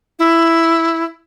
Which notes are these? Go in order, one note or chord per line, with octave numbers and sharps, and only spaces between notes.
E4